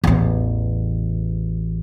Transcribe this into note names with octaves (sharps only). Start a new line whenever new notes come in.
A1 E2